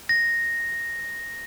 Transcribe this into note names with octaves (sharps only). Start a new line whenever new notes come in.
A#6